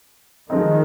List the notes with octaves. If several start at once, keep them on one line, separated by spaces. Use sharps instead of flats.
D#3 F3 G#3 C4 D#4